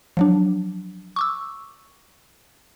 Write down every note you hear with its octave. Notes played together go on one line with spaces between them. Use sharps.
F3 F#3 D4
C#6 D6 E6